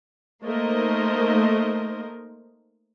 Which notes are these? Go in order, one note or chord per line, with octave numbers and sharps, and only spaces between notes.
A3 A#3 D#4 A#4 C5 D#5